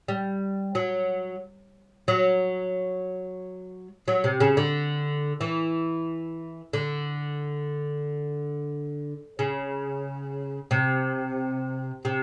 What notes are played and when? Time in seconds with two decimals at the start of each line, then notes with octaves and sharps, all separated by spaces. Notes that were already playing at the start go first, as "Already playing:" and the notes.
0.08 G3
0.75 F#3
2.08 F#3
4.08 F#3
4.24 C3
4.40 C#3
4.57 D3
5.41 E3
6.73 D3
9.39 C#3
10.71 C3
12.05 C3